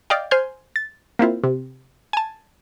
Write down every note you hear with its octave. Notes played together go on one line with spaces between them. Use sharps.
D5 D#5 F5 G5
C5 G#5 C6 F6 G6
A6
A#3 C4 E4 F4
C3
G#5 A5